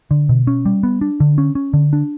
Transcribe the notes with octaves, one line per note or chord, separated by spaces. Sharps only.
D3
B2
C#4
G3
B3
D4
D3
C#4
C#4
D3
D4